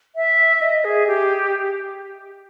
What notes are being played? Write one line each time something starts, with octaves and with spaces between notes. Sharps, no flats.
E5
D#5
G#4
G4